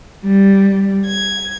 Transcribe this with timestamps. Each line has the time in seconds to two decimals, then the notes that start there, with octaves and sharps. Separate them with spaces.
0.25 G3
1.06 G#6